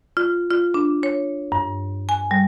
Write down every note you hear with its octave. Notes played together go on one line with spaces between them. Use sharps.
F4
F4
D4
C#5
G2
G#5
G3